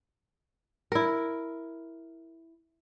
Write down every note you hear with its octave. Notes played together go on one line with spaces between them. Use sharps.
E4 A#4